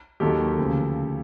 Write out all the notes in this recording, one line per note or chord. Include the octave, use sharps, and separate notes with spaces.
D#2 D#3 F#3 G4 A4
D2 C#3 F3